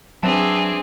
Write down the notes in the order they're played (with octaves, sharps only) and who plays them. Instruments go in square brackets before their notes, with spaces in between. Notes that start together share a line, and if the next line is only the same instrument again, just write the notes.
[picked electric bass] F#3 [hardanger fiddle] C4 [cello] D4 G#4 [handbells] B4 E5 A5